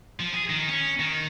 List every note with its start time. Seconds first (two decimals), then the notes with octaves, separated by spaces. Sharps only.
0.20 F3
0.34 G#4
0.50 D#3
0.69 C#4
1.00 D#3